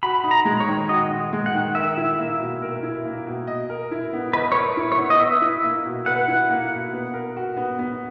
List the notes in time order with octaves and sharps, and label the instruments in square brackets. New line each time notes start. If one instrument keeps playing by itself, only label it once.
[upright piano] F#4 [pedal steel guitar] B5
[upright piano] D#4
[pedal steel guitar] A#5
[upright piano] G#3
[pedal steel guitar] C#5
[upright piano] D#3
[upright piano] F#4 [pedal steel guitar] D#5
[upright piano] D#4
G#3
[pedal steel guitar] F#5
[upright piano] D#3
[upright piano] A#4 [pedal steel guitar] E5
[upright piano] E4
A#3
B2
A#4
E4
A#3
B2
D#5
A#4
E4
B3
[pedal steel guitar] B4 [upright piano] D#5
[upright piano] A#4 [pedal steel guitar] C#5
[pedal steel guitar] B4
[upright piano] E4
[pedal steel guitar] C#5
[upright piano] B3
[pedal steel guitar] D#5
[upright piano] B4 [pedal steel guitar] E5
[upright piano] E4
A#3
B2
[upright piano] B4 [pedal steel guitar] F#5
[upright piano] E4
A#3
B2
B3
A#4
F#4
B3
B3